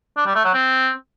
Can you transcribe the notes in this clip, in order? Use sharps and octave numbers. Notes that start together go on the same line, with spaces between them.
D4
G3
A3
F#3
C4